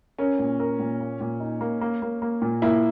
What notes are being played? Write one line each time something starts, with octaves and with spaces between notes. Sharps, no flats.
C#4 A#4
A#2
A#4
A#2
A#3
A#2
D#4
A#3
A#3
A#3
A#3
A#2
A#3 E4